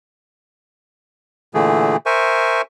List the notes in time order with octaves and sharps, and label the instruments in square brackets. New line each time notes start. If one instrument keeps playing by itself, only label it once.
[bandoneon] A#2 D3 E3 A3 G#4
A#4 C5 E5 G#5 C#6